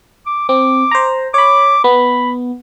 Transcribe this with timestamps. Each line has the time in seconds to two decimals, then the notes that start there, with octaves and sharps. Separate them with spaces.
0.26 D6
0.49 C4 D6
0.91 C5 A#5
1.34 C#5 B5 D6
1.84 B3 B5